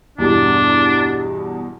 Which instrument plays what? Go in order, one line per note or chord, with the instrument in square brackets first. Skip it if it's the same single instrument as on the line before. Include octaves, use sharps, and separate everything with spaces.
[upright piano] E2 G2 B2 [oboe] D4